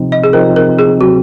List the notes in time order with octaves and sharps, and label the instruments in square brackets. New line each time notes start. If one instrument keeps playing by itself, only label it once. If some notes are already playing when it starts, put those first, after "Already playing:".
Already playing: [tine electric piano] C3 F3 C4 D#4
[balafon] D#5
G#4
[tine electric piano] C3 F3 C4 D#4 [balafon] A#4
[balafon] A#4
G#4
[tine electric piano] C3 F#3 C4 [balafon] F#4